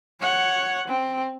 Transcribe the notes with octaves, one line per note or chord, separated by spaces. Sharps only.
C#5 F#5
C4